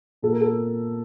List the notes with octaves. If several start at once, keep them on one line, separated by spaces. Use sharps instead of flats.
A#2 A4
A#4
A4